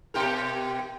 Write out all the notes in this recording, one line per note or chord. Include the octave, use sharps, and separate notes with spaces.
B2 G4 A#4